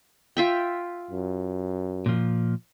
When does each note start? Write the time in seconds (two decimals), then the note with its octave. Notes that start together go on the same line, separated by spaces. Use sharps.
0.37 F4 E5 G5
1.11 F#2
2.06 A#2 F3